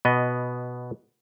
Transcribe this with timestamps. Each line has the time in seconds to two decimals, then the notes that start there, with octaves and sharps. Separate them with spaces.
0.05 B2 B3 D#5